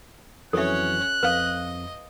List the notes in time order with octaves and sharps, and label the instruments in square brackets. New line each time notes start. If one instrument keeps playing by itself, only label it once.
[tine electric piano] F2 E3 F#3 [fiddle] C#4 C#5 [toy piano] A4 E5 [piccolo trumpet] F#6
[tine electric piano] F2 [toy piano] B4 F5 [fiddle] D#5